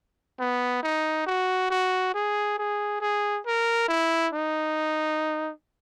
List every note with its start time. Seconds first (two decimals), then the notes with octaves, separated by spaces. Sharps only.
0.39 B3
0.83 D#4
1.27 F#4
1.70 F#4
2.14 G#4
2.58 G#4
3.01 G#4
3.46 A#4
3.88 E4
4.33 D#4